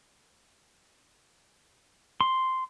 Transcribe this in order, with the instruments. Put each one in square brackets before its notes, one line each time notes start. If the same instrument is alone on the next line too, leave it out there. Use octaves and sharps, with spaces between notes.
[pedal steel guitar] C6